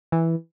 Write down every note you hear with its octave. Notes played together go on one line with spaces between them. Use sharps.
E3